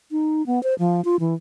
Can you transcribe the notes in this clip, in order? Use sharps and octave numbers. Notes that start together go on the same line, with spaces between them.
D#4
B3
C5
F3
F4
E3